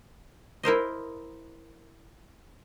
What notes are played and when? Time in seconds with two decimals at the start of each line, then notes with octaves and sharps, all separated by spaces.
0.63 E4 A#4 C5 D#5